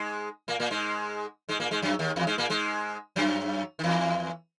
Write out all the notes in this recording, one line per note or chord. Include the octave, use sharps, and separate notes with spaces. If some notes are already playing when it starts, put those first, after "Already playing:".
Already playing: G#2 G#3
A#2 A#3
A#2 A#3
G#2 G#3
G#2 G#3
A#2 A#3
G#2 G#3
F#2 F#3
D#2 D#3
E2 E3
G#2 G#3
A#2 A#3
G#2 G#3
F#2 F#3
D#3
E2 E3